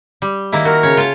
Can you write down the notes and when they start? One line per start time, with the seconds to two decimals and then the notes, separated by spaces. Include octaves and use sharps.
0.22 G3
0.52 D#3 A#3 E4
0.65 F#4 A#4
0.83 C#3 C#5
0.97 F4 A5